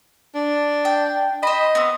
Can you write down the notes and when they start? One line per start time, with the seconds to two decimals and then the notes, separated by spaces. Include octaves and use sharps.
0.35 D4
0.85 G5
1.43 C5 D#5 B5
1.75 B3 C4